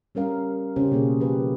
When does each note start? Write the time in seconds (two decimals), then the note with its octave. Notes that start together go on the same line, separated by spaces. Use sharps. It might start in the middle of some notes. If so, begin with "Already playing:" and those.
0.15 G3 C#4 A#4 F5
0.76 C#3 C#4 G4 C5
0.92 B2 A#3 G#4
1.20 C#3 F3 C#4 G4 B4